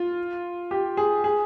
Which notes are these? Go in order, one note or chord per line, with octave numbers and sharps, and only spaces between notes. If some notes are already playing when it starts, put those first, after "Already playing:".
Already playing: F4
G4
G#4
G#4